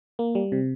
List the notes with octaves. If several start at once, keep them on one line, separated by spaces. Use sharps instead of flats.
A#3
G3
C3